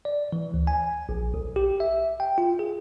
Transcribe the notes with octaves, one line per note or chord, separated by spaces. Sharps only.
D5
E3
D2
G#5
A#1
B1
G4
E5
G5
F4
G#4